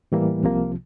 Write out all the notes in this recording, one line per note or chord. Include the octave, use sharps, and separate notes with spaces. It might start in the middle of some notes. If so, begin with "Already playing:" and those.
A2 E3 G3 A#3
C2 C3 F3 A#3